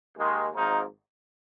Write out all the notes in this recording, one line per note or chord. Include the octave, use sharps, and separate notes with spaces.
D#2 D#3 G#3
G#1 G#2 F3 A#3 D#4